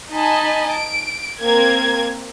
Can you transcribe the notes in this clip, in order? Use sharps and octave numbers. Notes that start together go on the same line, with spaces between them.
D#4 D#5 G#5 A5 B5
D7
A#3 C4 A#4 G#6